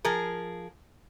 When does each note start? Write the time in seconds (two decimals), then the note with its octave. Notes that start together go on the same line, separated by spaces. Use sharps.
0.05 F3 G#4 A#4